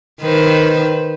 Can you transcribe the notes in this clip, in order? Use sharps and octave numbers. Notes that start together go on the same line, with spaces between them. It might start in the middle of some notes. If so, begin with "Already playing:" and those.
D#3 B4 C5